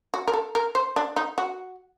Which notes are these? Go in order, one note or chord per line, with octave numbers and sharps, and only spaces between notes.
F#4
A#4
A4
A#4
C5
D4
D#4
F#4